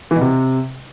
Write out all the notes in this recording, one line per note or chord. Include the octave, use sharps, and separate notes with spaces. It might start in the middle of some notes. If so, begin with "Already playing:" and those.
E3
B2
C3